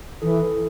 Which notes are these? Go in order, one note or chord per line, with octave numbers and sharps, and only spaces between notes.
E3 E4 A4